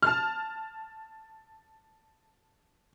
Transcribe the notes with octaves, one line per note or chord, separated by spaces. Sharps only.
A5 F6